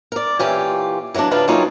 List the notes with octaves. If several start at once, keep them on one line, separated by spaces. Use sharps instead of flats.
A#4 D5
A#2 E3 C#4 F4 G4
E3 F#3 G#3 A#3 D4
C#3 G3 D4 D#4 F4 B4
F#3 G3 A#3 C#4 D#4 F4